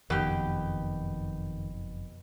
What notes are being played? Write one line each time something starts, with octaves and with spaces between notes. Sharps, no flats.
F#1 F2 B2 D#3 G4